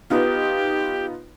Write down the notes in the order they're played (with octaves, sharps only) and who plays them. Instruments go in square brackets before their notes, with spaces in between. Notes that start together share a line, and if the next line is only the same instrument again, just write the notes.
[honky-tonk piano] B3 D#4 F4 [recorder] G4